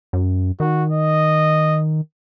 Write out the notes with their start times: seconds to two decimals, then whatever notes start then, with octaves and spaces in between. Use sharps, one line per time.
0.13 F#2
0.60 D#3 F#4
0.90 D#5